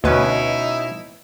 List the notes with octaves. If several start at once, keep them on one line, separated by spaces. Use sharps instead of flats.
D2 B2 C#4 D#4 E4 B4